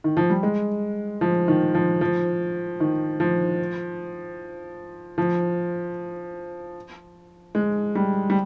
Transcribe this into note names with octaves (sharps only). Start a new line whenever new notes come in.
D#3
F3
G3
G#3
F3
D#3
F3
F3
D#3
F3
F3
G#3
G3
G3